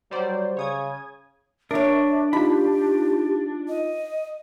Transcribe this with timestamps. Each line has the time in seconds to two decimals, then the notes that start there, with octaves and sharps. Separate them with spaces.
0.11 F#3 G3 C5 D5
0.57 C#3 C#5 D#6 G#6
1.71 D4 A#4 C#5 E5
2.33 D#4 F4 G4 B5
3.68 D#5